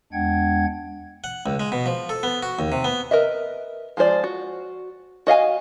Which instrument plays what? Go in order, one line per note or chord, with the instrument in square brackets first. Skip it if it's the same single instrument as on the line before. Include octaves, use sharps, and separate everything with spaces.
[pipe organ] E2 G#3 D4 F#5 G5 G#6
[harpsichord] F#5
C#2
G#3
B2
F3
A4
B3
F#4
D#2
C3
B3
[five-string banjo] A#4 B4 D#5 E5
F3 G#3 F4 C5 D5
F#4
F#4 D#5 F5 G#5